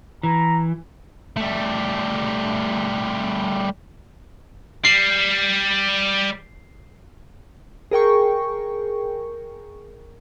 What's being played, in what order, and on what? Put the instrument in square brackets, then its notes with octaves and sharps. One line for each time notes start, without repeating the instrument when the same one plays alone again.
[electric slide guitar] E3 [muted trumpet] A#5
[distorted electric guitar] G3 A3
[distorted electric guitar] G3 [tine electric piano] C7
[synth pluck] G#4 A#4 G5 C#6